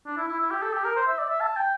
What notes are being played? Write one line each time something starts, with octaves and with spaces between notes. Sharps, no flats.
D4
E4
E4
E4
G4
A4
G4
A#4
C5
E5
D5
E5
A5
G5